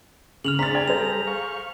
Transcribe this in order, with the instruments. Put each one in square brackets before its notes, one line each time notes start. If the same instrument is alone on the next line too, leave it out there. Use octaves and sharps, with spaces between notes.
[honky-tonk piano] C#3 [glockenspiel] F6 F7 F#7
[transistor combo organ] C4 D4 G#4 [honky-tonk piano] A#5 C6 A6 [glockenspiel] B6
[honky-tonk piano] D5 G5 G#6
[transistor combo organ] G3 A4 A#5 [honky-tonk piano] G#4 C5 [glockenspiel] F7
[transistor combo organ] F5 C#6